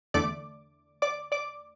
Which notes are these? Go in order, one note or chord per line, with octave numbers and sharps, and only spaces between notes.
E2 D3 A3 D5 D6
D5 D6
D5 D6